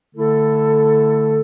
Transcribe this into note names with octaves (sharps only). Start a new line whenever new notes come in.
D3 A3 E4 A4